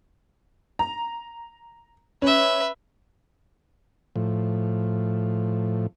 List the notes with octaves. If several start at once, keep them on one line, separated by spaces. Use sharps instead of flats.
A#5
C#4 B4 E5
A2 F3